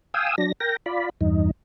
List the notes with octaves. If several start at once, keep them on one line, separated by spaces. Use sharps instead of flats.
F5 G5 G#5 D#6 E6
F#3 D4 A#6
A#4 G5 A#6
F4 D5 B5
E2 G2 D#4